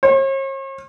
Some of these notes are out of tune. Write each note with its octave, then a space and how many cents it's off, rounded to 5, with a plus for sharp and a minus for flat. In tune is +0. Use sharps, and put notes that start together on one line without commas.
C#5 -45